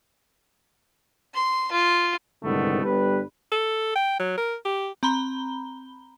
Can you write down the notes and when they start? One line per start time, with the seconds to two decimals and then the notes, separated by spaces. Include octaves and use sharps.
1.34 C6
1.72 F4
2.44 C2 G#2 D3 D#3 A3 B3
2.84 G1 G3 B4
3.52 A4
3.95 G5
4.20 F#3
4.37 A#4
4.65 G4
5.03 C4 A#5 B5 G7